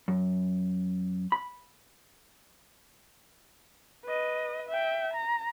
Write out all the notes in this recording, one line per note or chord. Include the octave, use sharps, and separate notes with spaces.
F#2
B5
B4 D#5
E5 G5
A#5